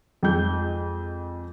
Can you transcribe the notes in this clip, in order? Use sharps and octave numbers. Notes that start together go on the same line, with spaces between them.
F2 G#3 G6